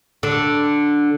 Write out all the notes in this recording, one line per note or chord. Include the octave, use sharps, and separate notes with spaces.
D3